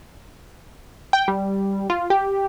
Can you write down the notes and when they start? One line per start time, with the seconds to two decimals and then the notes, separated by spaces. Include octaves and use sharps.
1.13 G5
1.28 G3
1.90 F4
2.10 G4